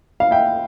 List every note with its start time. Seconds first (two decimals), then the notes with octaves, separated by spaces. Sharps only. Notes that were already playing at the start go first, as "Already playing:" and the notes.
0.20 F5
0.31 E5 G5